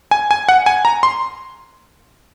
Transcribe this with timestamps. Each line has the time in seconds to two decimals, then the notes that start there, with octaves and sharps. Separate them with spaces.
0.11 G#5
0.31 G#5
0.49 F#5
0.66 G#5
0.85 A#5
1.03 C6